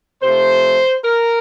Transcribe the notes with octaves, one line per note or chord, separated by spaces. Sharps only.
C3 F3 A3 C5
A#4